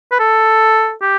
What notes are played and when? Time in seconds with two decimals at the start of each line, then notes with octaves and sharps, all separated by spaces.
0.11 B4
0.20 A4
1.02 G4